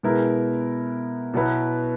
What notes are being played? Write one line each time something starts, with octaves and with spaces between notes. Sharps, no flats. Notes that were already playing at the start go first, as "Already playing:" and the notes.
B2 G#3 B3 E4 A#4
B2 F#3 B3 E4 B4